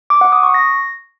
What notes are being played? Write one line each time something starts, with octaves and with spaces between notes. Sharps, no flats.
D6
F#5
D#6
C#6
A#6